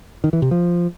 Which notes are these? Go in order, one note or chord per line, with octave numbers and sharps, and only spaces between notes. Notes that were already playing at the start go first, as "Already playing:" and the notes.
D#3
E3
C3
F3